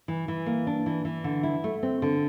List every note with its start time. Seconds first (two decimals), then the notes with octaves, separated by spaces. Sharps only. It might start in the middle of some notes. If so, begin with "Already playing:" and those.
0.08 E3
0.28 E3
0.46 A#3
0.67 D4
0.86 E3
1.05 E3
1.24 D3
1.43 E4
1.64 A3
1.83 C4
2.02 D3